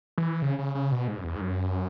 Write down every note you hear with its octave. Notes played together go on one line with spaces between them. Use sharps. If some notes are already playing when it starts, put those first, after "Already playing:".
E3
C#3
C#3
C#3
B2
G#2
F#2
E2
G#2
F#2